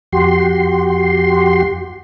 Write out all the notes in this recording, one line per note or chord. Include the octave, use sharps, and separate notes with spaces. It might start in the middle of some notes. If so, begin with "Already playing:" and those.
F2 F#4 G4 C6